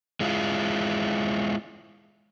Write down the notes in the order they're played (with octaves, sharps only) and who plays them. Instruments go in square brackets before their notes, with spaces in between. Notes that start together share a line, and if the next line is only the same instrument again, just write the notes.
[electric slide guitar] G#3 E4 F4